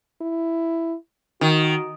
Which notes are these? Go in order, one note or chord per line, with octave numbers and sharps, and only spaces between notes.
E4
D#3 F#4